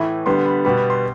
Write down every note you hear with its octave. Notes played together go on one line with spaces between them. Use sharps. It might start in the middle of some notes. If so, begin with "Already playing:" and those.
Already playing: A2 E3 A3 B5
D3 G3 B3 C6
B5
B2 G3 B3 B5
B5
C6